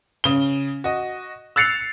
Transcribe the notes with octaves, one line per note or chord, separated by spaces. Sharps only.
C#3 G7
F#4 D#5
E6 F#6 A6 C7 C#7 F7